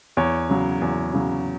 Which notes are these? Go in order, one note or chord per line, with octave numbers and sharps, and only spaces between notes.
E2 C#5
C#3 F#3
E2
C#3 F#3